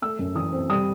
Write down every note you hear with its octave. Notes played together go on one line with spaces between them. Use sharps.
A3 E6
F#2
E3 D#6
C4
G3 D#6